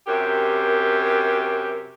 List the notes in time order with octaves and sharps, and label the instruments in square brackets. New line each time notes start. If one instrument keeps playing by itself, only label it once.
[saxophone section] F#2 C3 G4 [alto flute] A#4